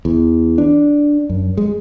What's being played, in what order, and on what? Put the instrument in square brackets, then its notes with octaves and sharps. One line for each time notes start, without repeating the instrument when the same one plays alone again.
[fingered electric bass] E2
D4
F#2
G#3